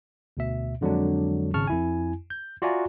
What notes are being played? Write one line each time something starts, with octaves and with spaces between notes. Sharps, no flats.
D2 B2 E5
F2 D3 F#3 G#3 D4
G#1 C#3 A5 C#6 F6
F2 E4 G#5
G6
F4 F#4 D5 E5 G#5 A#5